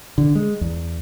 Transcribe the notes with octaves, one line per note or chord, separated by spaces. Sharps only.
D3
G#3
E2